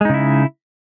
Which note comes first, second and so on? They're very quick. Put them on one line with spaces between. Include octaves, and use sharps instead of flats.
G#3 D#4 C#3 E4